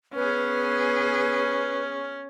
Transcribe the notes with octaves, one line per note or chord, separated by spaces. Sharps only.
B3 C#4 G#4 B4